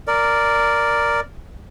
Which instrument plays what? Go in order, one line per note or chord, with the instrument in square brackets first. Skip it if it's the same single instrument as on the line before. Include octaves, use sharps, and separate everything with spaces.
[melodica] A#4 D5